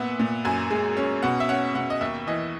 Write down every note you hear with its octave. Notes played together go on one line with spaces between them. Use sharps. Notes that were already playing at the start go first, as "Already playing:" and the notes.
Already playing: A#2 B3 E5 F#5
A#2
F#2 G#5
G#3
C#4
B2 F#5
E5
C#4 F#5
B2 F#5
D#5
D#2 E5
E3 D#5